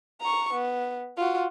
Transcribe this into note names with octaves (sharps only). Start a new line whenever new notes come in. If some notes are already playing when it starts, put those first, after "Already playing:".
A#5 C#6
B3
F4 F#4